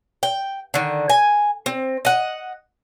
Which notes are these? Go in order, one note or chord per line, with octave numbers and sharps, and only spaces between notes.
G5
D3 D#3
G#5
C4
D#5 F#5